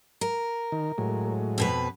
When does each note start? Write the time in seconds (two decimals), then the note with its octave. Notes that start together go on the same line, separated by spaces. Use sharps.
0.21 A#4
0.72 D#3
0.98 A2 F#3 G#3
1.58 F2 B2 B4